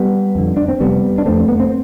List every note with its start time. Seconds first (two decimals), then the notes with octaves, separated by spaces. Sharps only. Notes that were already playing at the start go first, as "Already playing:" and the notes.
Already playing: G3 B3
0.35 F2 D3
0.57 D4
0.68 C4
0.80 F1 G3 B3
1.18 D4
1.26 F2 D3 A3 C4
1.48 B3
1.60 C4